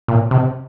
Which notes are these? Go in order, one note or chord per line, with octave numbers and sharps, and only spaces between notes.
A#2
C3